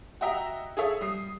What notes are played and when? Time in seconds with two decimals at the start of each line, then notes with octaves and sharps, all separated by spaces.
0.21 F#4 G4 D#5 E5 A#5
0.77 G#4 A4 C#5 E5
1.00 G3 D#6 C7